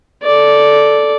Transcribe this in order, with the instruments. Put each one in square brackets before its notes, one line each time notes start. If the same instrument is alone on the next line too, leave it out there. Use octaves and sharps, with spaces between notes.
[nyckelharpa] A4 D5